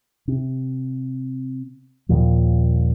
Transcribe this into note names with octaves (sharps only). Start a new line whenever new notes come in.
C3
D#2 A#2 F3